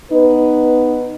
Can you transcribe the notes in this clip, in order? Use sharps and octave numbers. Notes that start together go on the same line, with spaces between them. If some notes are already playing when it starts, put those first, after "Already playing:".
B3 D#4 B4